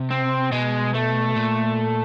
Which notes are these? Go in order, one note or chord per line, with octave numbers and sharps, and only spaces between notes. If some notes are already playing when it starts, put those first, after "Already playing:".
Already playing: C3
C4
B2 G#3
A3
A#2